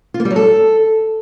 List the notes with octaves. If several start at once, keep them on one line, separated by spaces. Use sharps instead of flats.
F4
A#3
G3
F#3
A4